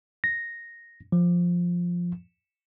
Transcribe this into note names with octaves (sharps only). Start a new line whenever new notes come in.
A#6
F3